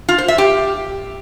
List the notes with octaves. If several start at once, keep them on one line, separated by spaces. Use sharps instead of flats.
F4
C5
E5
G4